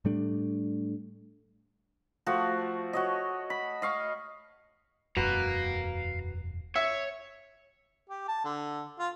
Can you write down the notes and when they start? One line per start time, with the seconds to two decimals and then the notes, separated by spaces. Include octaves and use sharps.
0.05 A2 G3 A3 D4
2.26 F3 A3 F#4
2.93 F#4 C#5 D#5
3.50 B5
3.82 D#5 F5 C#6
5.17 E1 F#2 F#4 B4 F5 F#5 A#5
6.76 C#5 E5
8.10 G4
8.28 A5
8.45 D3
8.99 F4